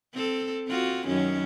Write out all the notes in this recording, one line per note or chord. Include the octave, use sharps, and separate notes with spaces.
C4 A4
C4 F4 F#4
F#2 D#3 C#4